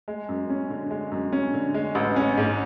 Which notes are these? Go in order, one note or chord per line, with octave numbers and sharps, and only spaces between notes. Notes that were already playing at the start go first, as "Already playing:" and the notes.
G#3
F#2
C#4
D3
G#3
F#2
C#4
D3
G#3
A1
C#4
G#2